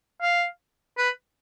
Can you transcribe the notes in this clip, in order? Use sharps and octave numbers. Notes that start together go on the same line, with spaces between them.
F5
B4